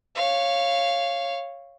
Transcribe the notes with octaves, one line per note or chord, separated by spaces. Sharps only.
C#5 F5